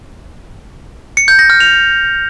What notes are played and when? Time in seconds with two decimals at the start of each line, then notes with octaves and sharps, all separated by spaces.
1.17 C#7
1.28 G6
1.39 A#6
1.50 F6
1.60 F7